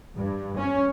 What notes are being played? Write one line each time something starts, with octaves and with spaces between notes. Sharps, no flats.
G2
C#4